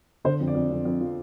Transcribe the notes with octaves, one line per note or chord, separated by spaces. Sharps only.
D3 C5
F2
D5
F2
F2
F2
F3